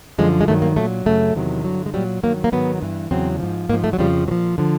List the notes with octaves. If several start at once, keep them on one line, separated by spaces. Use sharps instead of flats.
F#2 D3 F3 G#3
G#3
G2 D#3 F#3 A3
A#3
A#2 F#3 A3
F#2 C#3 F#3 A3
E2 C3 D#3 F#3
G2 D3 F#3
G#3
A#2 F#3 G3
G2 D#3 F#3 A#3
A#3
G#2 D#3 F#3 B3
G2 E3
E2 C#3 F#3 C4
G#2 F3
G#2 F3 A#3
A3
F#3
F2 C#3 F3 G3
A#2 F3 F#3
D3 F3